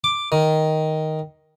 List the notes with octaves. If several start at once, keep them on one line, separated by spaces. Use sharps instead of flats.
D6
D#3